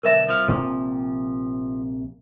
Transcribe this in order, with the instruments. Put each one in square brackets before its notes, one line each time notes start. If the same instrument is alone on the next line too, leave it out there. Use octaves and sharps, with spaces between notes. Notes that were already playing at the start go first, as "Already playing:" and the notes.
[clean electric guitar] B1 D3 A5 [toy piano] A#4 E5
[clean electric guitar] C2 F3 F5
[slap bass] A#1 C3 A#3 [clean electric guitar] F3